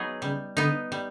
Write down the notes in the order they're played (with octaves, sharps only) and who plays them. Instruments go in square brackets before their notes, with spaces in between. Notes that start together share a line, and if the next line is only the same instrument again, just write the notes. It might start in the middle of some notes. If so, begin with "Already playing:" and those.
Already playing: [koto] F#3 B3 D#4 G#4
[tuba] C#3 [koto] G3
[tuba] D3 [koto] B3 D#4
[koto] G3